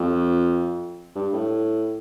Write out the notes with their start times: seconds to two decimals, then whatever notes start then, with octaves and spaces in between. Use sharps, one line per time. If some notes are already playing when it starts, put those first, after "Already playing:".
Already playing: F2
1.16 G2
1.33 A2